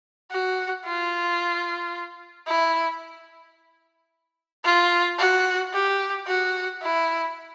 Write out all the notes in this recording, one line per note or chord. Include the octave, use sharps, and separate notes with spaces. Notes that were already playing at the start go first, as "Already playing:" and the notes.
F#4
F4
E4
F4
F#4
G4
F#4
E4